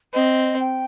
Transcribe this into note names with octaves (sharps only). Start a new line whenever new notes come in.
C4 D#5
G5